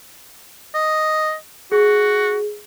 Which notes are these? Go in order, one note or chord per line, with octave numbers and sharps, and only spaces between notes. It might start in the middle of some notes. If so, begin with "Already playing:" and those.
D#5
F#4 G#4